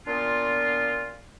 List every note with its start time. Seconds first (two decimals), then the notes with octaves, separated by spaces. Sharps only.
0.05 A#2 B3 D4 F4